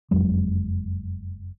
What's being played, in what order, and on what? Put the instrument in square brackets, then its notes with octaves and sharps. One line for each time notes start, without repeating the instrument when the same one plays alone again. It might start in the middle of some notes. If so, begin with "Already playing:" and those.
[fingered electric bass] F#1 F2 F#3 G#3